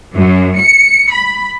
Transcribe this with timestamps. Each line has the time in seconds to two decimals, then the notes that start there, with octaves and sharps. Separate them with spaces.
0.16 F#2
0.58 C#7
1.12 B5